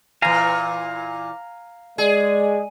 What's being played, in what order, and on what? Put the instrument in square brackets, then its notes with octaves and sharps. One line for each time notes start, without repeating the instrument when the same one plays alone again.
[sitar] A#2 E3 [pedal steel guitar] F5 G#5 A#5
[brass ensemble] G#3 D5 [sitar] G#4